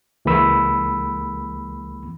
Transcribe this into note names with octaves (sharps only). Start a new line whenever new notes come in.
C#2 E3 G#3 A#3 B5 E6